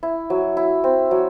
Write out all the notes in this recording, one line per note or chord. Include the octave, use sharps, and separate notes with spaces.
E4
F#3
E4
C4
F#3